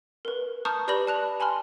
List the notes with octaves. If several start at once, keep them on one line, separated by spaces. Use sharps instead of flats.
A#4 B4
A5 A#5 C#6 D#6 F6 G6
G4 B4 D5 B5 A#6 F#7
A5 F#6 F7
G#5 A5 B5 C6 F6